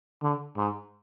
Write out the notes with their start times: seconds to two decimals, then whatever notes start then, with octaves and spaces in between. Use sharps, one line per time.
0.22 D3
0.57 G#2